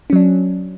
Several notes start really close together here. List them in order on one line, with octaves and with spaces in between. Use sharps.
C#4 F#3 D4